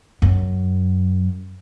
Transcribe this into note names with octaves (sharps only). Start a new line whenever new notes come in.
F#2